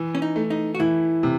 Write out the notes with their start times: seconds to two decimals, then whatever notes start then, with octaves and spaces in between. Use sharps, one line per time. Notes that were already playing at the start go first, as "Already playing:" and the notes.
Already playing: E3
0.15 C#4
0.22 D#4
0.36 A3
0.50 D#4
0.75 F#4
0.80 E3 E4
1.23 C3